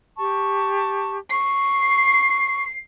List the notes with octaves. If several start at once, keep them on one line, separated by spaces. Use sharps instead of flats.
G4 A5 C#6
C#6 C7